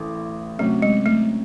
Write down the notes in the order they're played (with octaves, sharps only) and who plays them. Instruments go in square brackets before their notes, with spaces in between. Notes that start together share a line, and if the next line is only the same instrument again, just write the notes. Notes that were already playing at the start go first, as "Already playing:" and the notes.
Already playing: [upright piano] A1 A2
[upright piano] C3 F#3 C#4 [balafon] A3
[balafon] G#3
A3